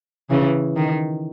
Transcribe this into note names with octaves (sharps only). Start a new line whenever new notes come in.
C#3 E3
D#3